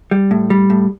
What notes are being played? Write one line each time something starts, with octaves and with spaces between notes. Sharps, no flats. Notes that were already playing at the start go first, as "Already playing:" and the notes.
G3
A2
G3
A2